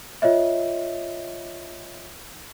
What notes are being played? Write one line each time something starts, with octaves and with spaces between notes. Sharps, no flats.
F4 C#5 D#5 E5